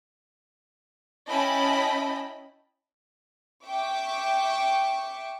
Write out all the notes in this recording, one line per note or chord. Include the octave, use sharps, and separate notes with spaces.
C#4 E4 D#5 G5 A5 B5
E5 G5 C#6 D6